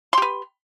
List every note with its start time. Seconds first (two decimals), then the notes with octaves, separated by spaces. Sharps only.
0.13 C6
0.18 G4
0.22 B4